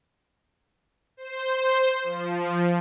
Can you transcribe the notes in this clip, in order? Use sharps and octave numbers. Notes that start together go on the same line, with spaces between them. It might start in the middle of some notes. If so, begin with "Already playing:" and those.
C5
F3